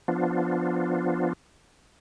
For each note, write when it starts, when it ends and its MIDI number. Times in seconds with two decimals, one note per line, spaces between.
0.08 1.33 53
0.08 1.33 59
0.08 1.33 62
0.08 1.33 65